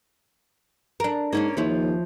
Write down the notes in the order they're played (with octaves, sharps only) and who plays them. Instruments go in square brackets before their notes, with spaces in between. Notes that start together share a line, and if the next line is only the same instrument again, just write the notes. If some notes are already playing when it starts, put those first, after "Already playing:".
[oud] D4 A#4
[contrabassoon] G#2 [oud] A#3 C#4 D4
[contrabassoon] D#2 [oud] F3 E4 C#5